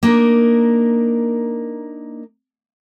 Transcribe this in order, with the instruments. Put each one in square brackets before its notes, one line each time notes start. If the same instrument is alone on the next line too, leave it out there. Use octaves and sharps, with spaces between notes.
[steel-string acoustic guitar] A#3 D4 D#4 A#4